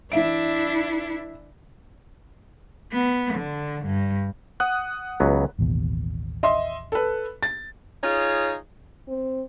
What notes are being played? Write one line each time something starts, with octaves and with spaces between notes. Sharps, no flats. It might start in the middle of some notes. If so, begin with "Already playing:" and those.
E3 D4 E4 E5 D7
B3
D3
G2
F#5 D#6 F#6
C#2 F#3 B3
A1 D#2 B2
D#5 E5 C6
A4 B4
A6
D#4 F4 G#4 C#5
C4